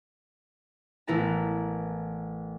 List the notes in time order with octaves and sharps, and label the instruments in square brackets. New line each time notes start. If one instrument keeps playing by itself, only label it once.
[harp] A1 B3 E4 A#4 B4 A5